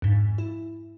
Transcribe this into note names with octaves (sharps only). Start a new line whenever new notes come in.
F2 G#2
E4